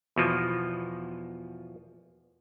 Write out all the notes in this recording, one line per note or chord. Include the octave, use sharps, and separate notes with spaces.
E2 B2 F3